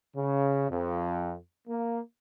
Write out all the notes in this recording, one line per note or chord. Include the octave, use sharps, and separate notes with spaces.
C#3
F2
A#3